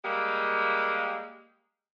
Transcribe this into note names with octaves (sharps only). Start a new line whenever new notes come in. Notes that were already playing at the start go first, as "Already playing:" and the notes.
G3 G#3 A#3